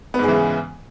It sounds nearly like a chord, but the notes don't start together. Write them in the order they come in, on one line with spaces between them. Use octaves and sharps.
B3 G#2 G#3 E3 C#3